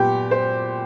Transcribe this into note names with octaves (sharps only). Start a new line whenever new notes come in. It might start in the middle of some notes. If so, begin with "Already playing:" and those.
Already playing: A#2 F#3 B3 G4
C5